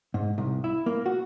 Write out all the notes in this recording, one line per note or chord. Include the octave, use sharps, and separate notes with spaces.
G#2
C2
E4
A#3
F#4